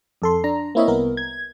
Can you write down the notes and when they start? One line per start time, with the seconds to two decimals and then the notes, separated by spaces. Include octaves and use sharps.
0.22 F2 A4 C6
0.44 D4 A#5
0.75 A#3 C4 E4 C#5 D#5 E5
0.87 C2 B3 A#4
1.17 G#6